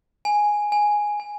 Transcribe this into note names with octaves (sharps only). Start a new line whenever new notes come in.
G#5
G#5
G#5